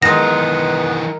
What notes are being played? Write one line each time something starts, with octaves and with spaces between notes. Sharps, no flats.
D#3 E3 G#3 B3 D#4 A#6